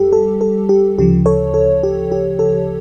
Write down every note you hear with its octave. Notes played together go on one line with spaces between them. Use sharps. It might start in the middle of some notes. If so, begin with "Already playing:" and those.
Already playing: F2 G3 G4 A4
A4
A4
G4
D2 C#3 F3 G4
A4 C#5
A4
G4
G4
A4